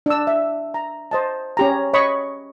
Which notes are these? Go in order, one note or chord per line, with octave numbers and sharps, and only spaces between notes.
D4 E6
E5
A#5
C5 D#5 A5
C#4 G4 A#5
C#5 D#5 B5 C#6